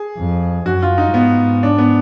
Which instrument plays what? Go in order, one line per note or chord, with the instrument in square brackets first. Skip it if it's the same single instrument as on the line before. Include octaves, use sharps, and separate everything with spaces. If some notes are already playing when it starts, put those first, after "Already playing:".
Already playing: [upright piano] G#4
[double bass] F2
[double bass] F#2 [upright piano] F#4
[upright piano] F4
D#4
[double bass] G#2 [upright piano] B3
[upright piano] D4
B3